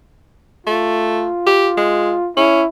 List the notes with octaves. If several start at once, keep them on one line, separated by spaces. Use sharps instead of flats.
A3 F4
G4
G#3
C#4 E4